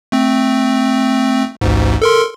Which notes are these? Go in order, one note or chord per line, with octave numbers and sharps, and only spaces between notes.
A3 C4
A1 D2 G#2
A4 A#4 C6